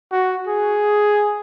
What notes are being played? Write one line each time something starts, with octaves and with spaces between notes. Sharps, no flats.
F#4
G#4